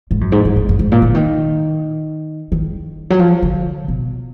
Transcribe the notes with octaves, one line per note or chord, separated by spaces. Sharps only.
G#2
F#2
G#2
F#2
F#2
F#2
G#2
A#2
D3
D#3
D#3
F#3
F3
D3
B2